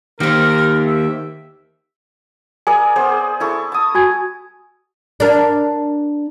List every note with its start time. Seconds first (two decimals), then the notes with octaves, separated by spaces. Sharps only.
0.20 D#3 A#3 C4 G4 A#4
0.86 E5
2.67 G#4 A#4 D5 G#5
2.96 B3 G#4 C5
3.40 E4 A4 C#6
3.72 A5 D#6
3.95 F#4 G#5 G#6
5.20 D4 A#4